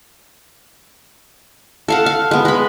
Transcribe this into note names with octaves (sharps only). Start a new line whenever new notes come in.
A4 F5 F#5
F5
G#3 B3
G#3 B5